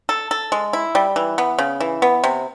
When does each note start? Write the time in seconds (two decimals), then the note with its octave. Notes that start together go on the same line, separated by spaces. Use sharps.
0.09 A4
0.31 A4
0.52 G#3
0.73 E4
0.95 G3
1.16 E3
1.38 B3
1.58 C#3
1.80 E3
2.02 B3
2.24 C3